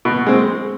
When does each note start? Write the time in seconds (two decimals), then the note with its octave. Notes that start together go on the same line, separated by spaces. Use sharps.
0.05 B2
0.26 G#3 C4